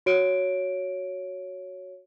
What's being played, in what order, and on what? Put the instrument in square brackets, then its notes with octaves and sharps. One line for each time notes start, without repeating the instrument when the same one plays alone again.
[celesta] F#4 C#5 D7